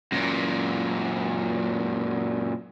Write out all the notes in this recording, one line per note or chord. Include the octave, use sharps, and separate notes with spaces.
F#2 A#2